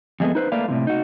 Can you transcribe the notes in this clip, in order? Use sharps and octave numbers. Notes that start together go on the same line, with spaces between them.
F2 G#3 A3 B3
D#4 B4 C5
A3 A#3 B4 D5 F5
A2 C3 F3
D#4 F#4